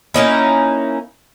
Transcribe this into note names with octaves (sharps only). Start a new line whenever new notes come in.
A#3 C#4 D#4 E4